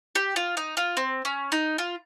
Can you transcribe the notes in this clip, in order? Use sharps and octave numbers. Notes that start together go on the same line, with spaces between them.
G4
F4
D#4
F4
C4
C#4
D#4
F4